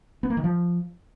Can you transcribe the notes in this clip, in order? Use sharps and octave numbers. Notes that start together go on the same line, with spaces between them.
B3
A#3
D#3
F3